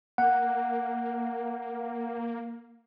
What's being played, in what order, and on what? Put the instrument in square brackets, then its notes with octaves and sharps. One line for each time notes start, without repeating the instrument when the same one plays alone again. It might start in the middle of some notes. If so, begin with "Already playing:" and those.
[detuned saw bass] A#3 [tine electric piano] F#5